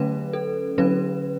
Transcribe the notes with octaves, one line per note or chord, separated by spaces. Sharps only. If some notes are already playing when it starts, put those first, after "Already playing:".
Already playing: D3 F#3 A3 C#4 B4
A4
D3 F#3 C#4 B4